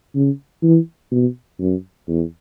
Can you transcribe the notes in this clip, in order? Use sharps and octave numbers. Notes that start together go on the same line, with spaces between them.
C#3
E3
B2
F#2
E2